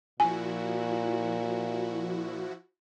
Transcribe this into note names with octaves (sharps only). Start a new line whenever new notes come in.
A#2 F3 E4 F#4 G#5